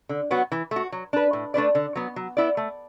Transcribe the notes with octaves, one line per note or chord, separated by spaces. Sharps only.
D3
F#3 B3 F#4
E3
A3 F#4
F#3
D4 B4
A2
A3 D4 B4 D5
D3
F#3 B3
F#3
B3 E4 D5
A3